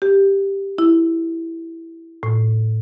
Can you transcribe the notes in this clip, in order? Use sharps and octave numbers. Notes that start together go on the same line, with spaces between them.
G4
E4
A2